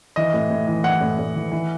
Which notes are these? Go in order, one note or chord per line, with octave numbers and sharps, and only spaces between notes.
E3 D#5
A2
A2
E3
E3 F#5
A2
A2
E3
E3